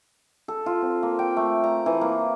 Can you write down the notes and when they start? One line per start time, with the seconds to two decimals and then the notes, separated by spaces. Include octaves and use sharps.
0.48 A4
0.66 F4
0.82 C4
1.03 A#3
1.19 G5
1.37 A3
1.64 A#5
1.86 E3
2.01 A#3